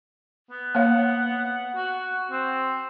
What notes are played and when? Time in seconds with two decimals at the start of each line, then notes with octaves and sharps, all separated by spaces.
0.51 B3
0.75 A#3 C#5 F5 F#5
1.76 F#4
2.31 C4